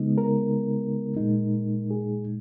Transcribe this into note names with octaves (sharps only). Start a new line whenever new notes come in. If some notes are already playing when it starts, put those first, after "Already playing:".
Already playing: C#3 G#3 B3 D#4
A#4
A#2 G#3 D#4
G#4